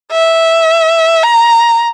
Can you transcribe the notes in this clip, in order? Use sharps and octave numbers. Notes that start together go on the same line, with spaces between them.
E5
A#5